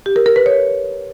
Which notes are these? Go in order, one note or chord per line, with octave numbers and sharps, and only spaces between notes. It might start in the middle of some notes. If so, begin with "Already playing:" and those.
G4
A#4
A#4
B4
C#5